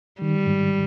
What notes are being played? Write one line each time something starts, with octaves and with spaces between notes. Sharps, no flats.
D#3 G3
G#2